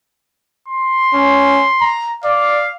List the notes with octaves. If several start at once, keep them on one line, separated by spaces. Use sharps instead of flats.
C6
C#4
A#5
D5 F5